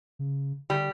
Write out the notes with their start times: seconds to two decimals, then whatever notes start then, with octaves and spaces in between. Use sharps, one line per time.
0.19 C#3
0.70 D3 G3